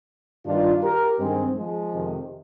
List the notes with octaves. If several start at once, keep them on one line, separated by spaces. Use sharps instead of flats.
G2 D#3 D4 F4
G4 A#4
G2 D#3 G#3 C4
F3 G#3
F2 C3 D#3